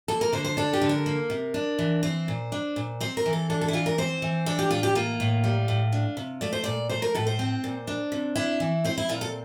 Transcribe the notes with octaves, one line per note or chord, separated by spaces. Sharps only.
A#3 A4
A#4
D3 C5
C5
D4 A4
G4
D3
A#4
A#3
C3
D4
E3
C4 C5
A#2
D4
A#2
C4 C5
A#4
E3
A4
D4 A4
A4
E4
E3 F4
A#4
C4 C5
E3
D4 A4
G4
A2 F4
G4
A#3 F4
A2
G3
A2
D4
C3
A3 D5
C5
A#2 D5
A3 C5
A#4
A2 A4
C5
C4
A#2
D4
C3
D4 E4
E3
C4 C5
E4
A#2 F4
A4